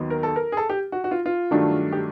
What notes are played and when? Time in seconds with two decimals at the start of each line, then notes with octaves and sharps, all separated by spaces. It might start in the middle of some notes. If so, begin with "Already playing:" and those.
Already playing: D#2 D#3 F#3 B3 D#4
0.10 A#4
0.23 A4
0.36 A#4
0.52 G#4
0.57 A4
0.69 G4
0.92 F#4
1.04 F#4
1.11 F4
1.26 F4
1.51 G2 D#3 F#3 A3 D4
1.92 G4